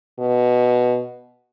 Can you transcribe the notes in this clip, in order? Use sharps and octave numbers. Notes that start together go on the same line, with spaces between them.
B2